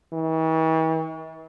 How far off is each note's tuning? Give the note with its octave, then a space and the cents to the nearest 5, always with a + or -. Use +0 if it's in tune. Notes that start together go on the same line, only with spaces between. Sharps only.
E3 -45